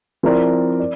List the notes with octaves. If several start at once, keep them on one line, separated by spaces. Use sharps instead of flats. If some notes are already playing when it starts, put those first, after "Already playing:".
F3 C4 E4 A#4 D5
D5